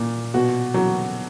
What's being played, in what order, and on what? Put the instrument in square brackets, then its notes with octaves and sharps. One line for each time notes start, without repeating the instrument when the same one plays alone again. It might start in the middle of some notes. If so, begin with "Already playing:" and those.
Already playing: [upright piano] A#2
B2 F#4
F#3